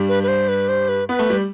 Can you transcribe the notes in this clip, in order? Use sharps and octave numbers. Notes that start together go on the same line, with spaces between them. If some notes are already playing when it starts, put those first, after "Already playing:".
Already playing: G2 G3
B4
B4
C5
B4
C5
B4
B3 B4
A3
G3